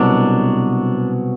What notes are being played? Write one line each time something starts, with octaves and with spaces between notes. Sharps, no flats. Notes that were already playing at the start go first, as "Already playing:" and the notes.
Already playing: C2 B2 F#3 D4